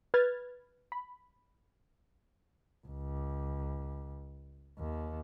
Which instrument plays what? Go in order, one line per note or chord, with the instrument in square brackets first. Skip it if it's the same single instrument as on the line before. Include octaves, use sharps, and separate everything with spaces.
[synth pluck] B4 F6 G#6 A6
B5
[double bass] C#2
D#2